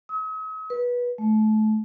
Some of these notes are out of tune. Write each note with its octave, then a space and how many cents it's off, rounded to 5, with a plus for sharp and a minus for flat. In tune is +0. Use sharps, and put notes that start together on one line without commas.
D#6 +45
B4 -20
A3 -30